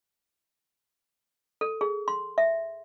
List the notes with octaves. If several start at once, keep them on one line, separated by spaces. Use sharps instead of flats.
A4
G#4
C6
E5